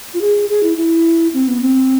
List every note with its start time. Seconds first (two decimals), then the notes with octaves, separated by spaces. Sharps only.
0.14 F4
0.21 G#4
0.49 G#4
0.63 E4
0.77 E4
1.34 C4
1.48 B3
1.61 C4